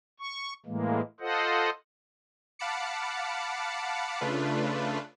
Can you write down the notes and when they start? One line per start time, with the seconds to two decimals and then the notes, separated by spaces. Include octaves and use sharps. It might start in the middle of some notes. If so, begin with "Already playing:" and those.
0.20 C#6
0.66 A2 E3 G#3 A#3
1.20 F4 A4 C5 D#5 F#5
2.59 F5 F#5 A5 B5 D6 C#7
4.21 C#3 A3 D4 F4 B4